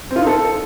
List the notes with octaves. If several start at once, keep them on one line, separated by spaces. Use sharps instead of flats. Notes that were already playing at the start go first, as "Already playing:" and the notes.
C4
F4
D#4
A4